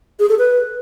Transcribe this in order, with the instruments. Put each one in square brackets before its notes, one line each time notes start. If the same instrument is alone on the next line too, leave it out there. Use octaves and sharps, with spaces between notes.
[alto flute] G#4
A4
B4